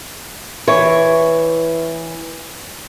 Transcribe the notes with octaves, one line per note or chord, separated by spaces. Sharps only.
E3 C#5